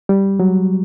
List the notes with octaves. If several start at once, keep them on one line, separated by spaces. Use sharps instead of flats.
G3
F#3